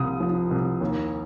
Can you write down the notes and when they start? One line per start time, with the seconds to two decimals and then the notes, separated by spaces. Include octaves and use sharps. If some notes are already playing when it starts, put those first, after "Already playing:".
Already playing: C2 C3 F3 D#6
0.20 F3
0.51 C2
0.81 D#2